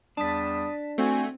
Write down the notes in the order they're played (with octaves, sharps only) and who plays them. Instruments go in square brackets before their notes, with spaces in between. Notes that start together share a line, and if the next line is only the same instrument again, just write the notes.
[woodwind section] E2 G3 D#6 [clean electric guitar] D4 [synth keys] A5 B6
[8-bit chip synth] A3 [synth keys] C4 [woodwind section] F#4 G#5